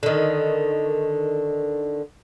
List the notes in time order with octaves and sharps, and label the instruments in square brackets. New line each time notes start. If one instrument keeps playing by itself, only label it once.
[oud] D3 D#3